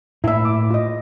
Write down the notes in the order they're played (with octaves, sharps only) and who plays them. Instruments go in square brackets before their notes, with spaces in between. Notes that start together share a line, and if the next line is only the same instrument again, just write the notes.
[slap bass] A2 A#3 [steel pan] E4 E5
[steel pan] D6
F4 D#5